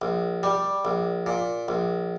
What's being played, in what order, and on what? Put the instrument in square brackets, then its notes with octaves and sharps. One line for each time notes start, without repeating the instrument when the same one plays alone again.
[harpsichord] A#1
G3
A#1
A#2
A#1